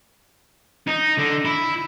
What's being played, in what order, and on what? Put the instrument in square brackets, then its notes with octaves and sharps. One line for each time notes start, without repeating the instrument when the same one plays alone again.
[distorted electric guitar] D#4
D3
E4